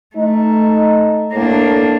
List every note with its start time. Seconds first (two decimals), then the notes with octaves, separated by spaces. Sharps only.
0.16 A3 D#4
1.32 A2 A#3 D4